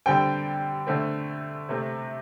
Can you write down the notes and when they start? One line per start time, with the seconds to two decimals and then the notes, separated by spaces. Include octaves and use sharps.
0.06 D3 G3 C4 G5
0.87 D3 A3 C4
1.69 C3 A3 C4